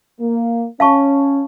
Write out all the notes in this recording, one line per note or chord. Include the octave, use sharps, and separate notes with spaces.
A#3
C#4 F5 A5 C#6